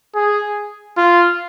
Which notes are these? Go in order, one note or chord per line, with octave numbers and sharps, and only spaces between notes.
G#4
F4